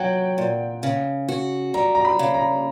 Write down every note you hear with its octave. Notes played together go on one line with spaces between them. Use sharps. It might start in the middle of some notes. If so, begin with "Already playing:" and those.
Already playing: F#3 F#5 G5
A#2
C#3
F#4
G3 A#5
A#5
B5
C#3
A#5